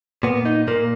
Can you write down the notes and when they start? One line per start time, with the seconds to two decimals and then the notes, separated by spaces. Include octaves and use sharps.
0.23 A#2 B3
0.45 D#4
0.68 A#2 A#3